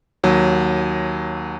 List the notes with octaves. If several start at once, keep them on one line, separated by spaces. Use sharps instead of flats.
D#2 F#3